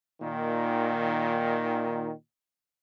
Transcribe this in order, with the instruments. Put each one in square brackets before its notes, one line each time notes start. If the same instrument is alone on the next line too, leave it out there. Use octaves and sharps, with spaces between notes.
[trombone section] A#2 D#3